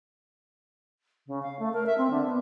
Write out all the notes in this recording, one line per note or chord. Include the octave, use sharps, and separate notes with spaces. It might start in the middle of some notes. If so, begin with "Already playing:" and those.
C#3
F5
A3
A#4
E5
C4
D3
B3